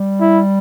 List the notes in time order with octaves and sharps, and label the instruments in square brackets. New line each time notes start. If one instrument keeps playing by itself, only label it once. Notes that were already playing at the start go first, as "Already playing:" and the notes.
Already playing: [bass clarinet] G3
[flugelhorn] E4